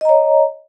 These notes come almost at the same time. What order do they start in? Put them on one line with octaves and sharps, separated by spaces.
D#5 A#5 C#5